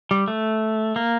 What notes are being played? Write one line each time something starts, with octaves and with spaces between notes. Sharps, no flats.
G3
A3
A#3